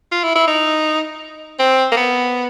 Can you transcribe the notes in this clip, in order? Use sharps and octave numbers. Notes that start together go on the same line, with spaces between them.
F4
E4
E4
D#4
C4
A#3
B3